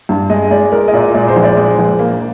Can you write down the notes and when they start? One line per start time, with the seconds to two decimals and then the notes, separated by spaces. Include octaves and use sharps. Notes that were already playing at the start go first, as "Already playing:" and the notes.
0.09 G2
0.29 G#3 D#5
0.50 G#3 D5
0.72 G#3 A#4
0.88 D#5
0.93 A#2 D5
1.14 G#3 D5
1.28 C5
1.36 A#1
1.43 D5
1.57 G#3
1.78 A#1
1.99 A#3